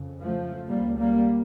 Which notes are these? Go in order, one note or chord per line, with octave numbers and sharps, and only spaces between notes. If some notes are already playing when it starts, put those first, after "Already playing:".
Already playing: F2 C#3
F3 A3
C#2 C#3 G3 A#3
G3 A#3